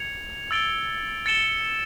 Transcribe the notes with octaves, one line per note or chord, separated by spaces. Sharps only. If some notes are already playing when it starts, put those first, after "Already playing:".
Already playing: G#6 C#7 F7
E6 A6 D7 G7
A6 C#7 E7 G7